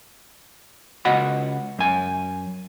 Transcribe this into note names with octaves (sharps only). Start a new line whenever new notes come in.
C#2 F#4 D#5 F#5 B5
F#2 G#5